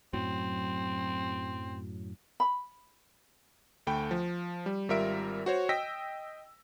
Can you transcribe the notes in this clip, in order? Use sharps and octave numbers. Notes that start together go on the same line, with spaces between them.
F#2 A2 F#3 C4
B5
D2 A3 G5 B5
F3
G3
G#1 G3 F4 A#4 E5 D7
F#4 C5 C#5
D#5 G5 E6 A#6 B6